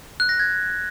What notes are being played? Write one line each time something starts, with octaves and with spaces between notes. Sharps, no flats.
F#6
A#6
G#6